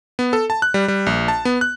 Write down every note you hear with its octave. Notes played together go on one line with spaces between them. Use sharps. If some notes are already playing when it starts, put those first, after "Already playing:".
B3
A4
A5
F#6
G3
G3
A#1
A5
B3
F#6